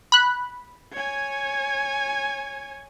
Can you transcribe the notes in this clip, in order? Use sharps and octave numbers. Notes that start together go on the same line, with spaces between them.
B5 F#6
C#5 G#5